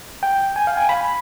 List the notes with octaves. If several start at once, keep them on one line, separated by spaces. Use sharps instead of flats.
G5
G#5
F5
G#5
B5